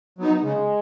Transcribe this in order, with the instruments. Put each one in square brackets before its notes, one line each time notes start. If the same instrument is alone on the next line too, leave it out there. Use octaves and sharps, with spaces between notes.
[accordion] F#3 B3 D#4
[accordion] C#3 [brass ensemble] G#3